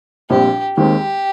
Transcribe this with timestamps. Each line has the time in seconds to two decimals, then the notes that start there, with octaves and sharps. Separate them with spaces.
0.30 A#1 A#2 G3 C4 G4
0.77 D#2 D#3 G#3 C4 G4